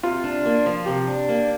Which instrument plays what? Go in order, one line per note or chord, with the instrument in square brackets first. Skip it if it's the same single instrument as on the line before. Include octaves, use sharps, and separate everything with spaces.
[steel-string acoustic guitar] C3 [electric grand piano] F4
[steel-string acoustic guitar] D4
A#3
F3
[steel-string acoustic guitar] C3 [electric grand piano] G4
[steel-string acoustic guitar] D4
A#3